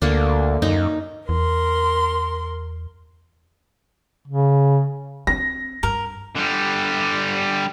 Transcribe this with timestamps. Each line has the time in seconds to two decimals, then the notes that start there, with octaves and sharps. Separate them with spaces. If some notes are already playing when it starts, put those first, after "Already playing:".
0.02 D2 D3 A#3 D4
0.62 F#2 D#4
1.29 E2 A#4 C6
4.28 C#3
5.27 C4 A#6
5.83 G2 A#4
6.35 D3 G3